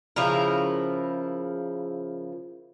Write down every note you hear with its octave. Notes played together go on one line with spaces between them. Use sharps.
C#3 F3 E4 A#4